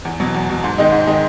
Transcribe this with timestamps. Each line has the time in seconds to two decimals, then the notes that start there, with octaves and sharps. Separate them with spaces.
0.05 E2
0.20 B2 F#3
0.34 E2
0.49 B2 F#3
0.64 G#2
0.78 D#3 G#3 C4 D#4
0.92 G#2
1.07 D#3 G#3 C4 D#4